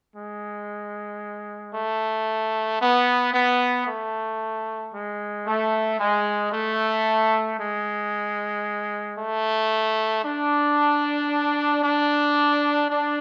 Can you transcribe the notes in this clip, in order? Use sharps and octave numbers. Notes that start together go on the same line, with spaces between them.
G#3
A3
B3
B3
A3
G#3
A3
G#3
A3
G#3
A3
D4
D4
D4